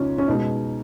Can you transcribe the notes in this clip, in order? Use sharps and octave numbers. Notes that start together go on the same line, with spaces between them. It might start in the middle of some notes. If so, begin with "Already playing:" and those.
Already playing: C#2 C#3 C#4 D#4 F4
C#4
B2 G#3 D#4